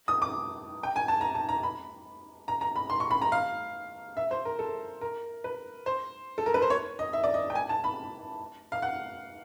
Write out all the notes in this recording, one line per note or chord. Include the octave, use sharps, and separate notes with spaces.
D#6
D6
G5
G#5
A5
A#5
A5
A#5
B5
A#5
A#5
B5
C6
C#6
B5
A#5
F5
E5
C5
A#4
A4
A#4
B4
C5
A4
A#4
B4
C5
C#5
D#5
E5
D5
D#5
G5
G#5
A5
B5
F5
F#5